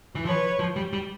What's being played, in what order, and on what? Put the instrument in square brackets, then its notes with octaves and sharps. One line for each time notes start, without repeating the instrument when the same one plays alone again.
[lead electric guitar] E3
[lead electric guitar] F3 [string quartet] B4 C#5
[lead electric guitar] F3
G3
G3